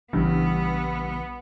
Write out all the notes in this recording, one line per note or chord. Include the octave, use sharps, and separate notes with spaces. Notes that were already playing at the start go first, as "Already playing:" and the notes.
A#1 G2 C#3 E3 B3